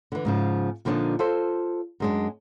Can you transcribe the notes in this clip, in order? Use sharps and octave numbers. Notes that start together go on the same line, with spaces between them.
D3 E3
G#2 C#3 F3
A#2 D3 F3 C4 D4 D#4
F4 A4 C5
F#2 G#3 D4